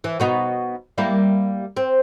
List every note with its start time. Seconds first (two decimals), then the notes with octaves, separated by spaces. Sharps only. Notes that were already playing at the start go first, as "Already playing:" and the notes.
0.04 E3
0.20 B2 B3 D#4
0.98 G3 A#3 E4
1.77 C4